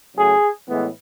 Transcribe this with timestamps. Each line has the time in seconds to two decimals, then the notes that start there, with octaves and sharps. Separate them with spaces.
0.16 C#3 F#3 A3 G#4
0.69 A2 E3 G#3 B3